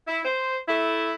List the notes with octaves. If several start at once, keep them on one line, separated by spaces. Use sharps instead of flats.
E4
C5
A3 E4